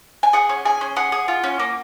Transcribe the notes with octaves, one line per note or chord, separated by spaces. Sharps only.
G#5
G#4 F#5
C#4
G#4 G#5
C#4
G#4 F#5
G#4
F4
C#4
A#3